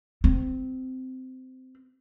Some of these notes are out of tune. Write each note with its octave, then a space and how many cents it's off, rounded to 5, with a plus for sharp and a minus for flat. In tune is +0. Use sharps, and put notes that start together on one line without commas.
C4 -20